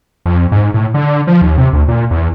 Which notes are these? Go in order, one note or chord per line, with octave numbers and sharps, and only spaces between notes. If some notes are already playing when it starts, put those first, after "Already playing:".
F2
G#2
A2
D3
F3
D#2
C3
D2
A#2
E2